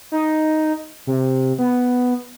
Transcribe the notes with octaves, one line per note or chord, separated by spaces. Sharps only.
D#4
C3
B3